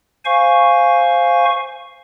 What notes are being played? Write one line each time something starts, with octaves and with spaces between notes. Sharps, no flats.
C5 F5 G#5 C#6